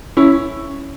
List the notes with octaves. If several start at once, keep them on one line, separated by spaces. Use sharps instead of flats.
C#4 E4